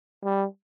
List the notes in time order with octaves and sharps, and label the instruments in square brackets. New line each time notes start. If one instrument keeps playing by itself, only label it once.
[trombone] G3